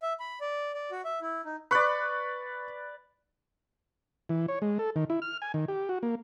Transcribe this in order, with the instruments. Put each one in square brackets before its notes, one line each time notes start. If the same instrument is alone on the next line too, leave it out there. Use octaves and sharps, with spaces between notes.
[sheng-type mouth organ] E5
B5
D5
D5
F#4
E5
E4
D#4
[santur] B4 D5 [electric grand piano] B5 C#6 F#6
[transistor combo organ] E3
C#5
G#3
A4
D#3
E4
F6
G#5
D#3
G4
F#4
A#3